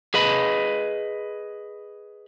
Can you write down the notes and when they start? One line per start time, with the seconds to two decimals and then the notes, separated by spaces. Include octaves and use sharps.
0.14 G#4 B4 D#5 B5